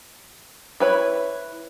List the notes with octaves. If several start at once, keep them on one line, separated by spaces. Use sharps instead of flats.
E4 B4 C#5